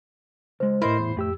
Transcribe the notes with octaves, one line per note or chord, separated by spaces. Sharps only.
C#2 G#3 C5
A2 E4 A#4 C5 D#5 B5
E2
F2 A2 G4 E6